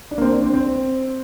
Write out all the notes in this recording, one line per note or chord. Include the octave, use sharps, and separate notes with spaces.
D4
A#3
C4
D4
C4
C4